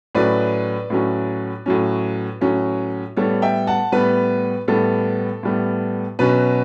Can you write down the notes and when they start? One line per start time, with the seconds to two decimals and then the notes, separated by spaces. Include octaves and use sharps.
0.15 A2 F#3 C#4 B4 D5
0.90 A2 F#3 C#4
1.66 A2 F#3 C#4
2.41 A2 F#3 C#4
3.17 A2 G3 B3 A4 C#5
3.42 E5 G5
3.67 F#5 A5
3.92 A2 G3 B3 B4
4.68 A2 G3 B3 A4
5.43 A2 G3 B3
6.19 B2 F#3 C#4 B4